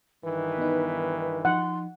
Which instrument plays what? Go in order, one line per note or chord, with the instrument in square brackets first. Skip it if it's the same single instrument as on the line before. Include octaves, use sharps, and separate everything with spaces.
[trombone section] G2 D#3 E3 [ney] B4
[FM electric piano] B3 D#4
[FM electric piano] F3 D#4 [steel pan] F#5 [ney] C6